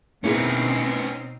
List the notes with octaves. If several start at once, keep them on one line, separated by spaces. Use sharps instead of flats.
B2 A#3 C4 C#4 D#4 E4 G#4 B4